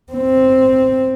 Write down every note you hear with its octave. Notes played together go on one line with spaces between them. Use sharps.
C4